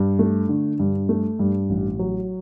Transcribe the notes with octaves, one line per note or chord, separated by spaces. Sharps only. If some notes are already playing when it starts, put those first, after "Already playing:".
Already playing: G2
A3
D3
G2
A3
G2
A1
F#3